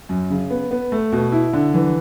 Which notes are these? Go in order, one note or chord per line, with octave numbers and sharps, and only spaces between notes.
F#2
C#3
B3
B3
A3
B2
E4
D3
E3